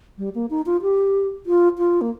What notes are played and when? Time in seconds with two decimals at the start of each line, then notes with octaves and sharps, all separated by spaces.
0.18 G3
0.35 A#3
0.50 D#4
0.66 F4
0.82 G4
1.46 F4
1.78 F4
2.01 A#3